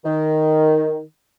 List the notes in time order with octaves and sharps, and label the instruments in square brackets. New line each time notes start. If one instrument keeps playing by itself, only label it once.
[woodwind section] D#3